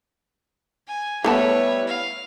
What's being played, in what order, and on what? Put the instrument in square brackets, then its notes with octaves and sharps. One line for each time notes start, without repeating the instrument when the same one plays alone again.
[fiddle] G#5
[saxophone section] G3 E4 [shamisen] A3 B3 A5 [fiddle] B4 C#5
[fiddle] F5